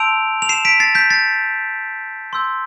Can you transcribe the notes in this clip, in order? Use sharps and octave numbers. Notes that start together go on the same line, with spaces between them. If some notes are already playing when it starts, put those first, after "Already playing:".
Already playing: A5 C6 E6 G6 D7 F7
F7
C7 E7
B6 D7
A6 C7
G6 B6
A6 C7
C6 E6 G6